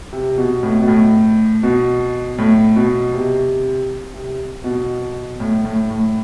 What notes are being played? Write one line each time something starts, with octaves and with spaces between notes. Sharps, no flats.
C3
B2
A2
B2
A2
B2
A2
B2
C3
C3
B2
A2
A2
A2